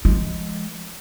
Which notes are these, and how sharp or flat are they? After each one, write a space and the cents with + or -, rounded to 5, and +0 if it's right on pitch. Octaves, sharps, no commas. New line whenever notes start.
F3 -40 G#3 +0